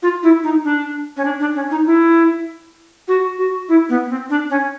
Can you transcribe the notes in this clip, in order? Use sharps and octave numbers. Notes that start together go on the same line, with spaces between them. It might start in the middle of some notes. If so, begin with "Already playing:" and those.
F4
E4
D#4
D4
C#4
D4
D4
C#4
D#4
E4
F#4
F#4
E4
B3
C4
D4
C#4